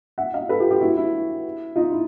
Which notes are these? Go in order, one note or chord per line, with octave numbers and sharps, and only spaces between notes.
E5 F#5
D#5 F5
A4 B4
F4 G4
F4 G4
E4 F#4
E4
D#4 F4
E4